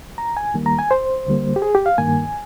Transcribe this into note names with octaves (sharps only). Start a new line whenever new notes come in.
A#5
G#5
D#2 D#3 G3 A#3
A#5
G#5
C5
D2 D3 G3 A#3
G4
G#4
G4
F5
G2 D#3 A#3 G#5